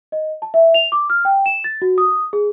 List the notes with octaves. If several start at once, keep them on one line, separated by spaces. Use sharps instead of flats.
D#5
A5
E5
F7
D6
F6
G5
E7
A6
F#4
D#6
G#4